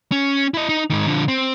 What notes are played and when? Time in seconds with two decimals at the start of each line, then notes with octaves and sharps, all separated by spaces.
0.12 C#4
0.54 E4 D#5
0.69 D#4
0.90 G#2 D#3
1.06 D3 F3
1.28 C4